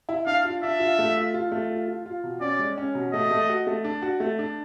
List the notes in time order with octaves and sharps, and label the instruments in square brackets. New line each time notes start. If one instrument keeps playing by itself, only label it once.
[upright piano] E4
[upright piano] D4 [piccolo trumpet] F5
[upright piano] F4
[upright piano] D4 [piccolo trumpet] E5
[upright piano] F4
A3
F4
F4
A3
F4
F4
F4
B2
[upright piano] C#4 [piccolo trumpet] D5
[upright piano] G#3
C#4
B2
[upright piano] A3 [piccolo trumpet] D#5
[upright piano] A3
F#4
A3
D4
F#4
A3
D4